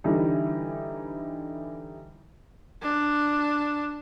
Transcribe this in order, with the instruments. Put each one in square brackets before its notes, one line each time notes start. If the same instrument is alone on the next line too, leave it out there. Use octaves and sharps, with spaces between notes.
[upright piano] D3 E3 G3 D#4
[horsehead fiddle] D4